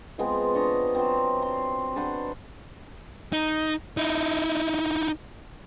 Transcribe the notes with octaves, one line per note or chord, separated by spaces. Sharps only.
F3 G#3 B3 C4
D4 C#5 D#5
F#3 C4
C6
D4 B4 C5 F#5
D#4
D#4 E4